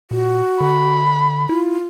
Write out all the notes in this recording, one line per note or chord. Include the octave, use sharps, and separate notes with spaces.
A#2 F#4
D3 B5
E4 F4